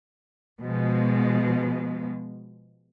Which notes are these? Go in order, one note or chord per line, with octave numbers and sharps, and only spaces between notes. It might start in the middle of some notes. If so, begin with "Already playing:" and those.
B2 F3 G#3